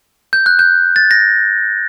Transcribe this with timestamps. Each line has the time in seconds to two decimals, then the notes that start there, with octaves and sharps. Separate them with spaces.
0.33 G6
0.46 F#6
0.59 G6
0.96 A6
1.11 A#6